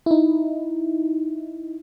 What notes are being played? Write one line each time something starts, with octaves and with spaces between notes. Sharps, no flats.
D#4 E4